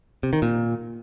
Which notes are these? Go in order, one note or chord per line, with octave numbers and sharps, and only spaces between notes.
C3
D#3
A#2